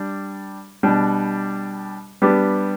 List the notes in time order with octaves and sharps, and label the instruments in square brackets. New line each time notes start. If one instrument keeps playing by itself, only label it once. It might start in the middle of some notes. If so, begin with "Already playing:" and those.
Already playing: [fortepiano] G3 D4
B2 G3 D4
G3 B3 D4 G4